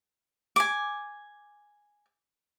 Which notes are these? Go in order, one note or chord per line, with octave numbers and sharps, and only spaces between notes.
G#5 D6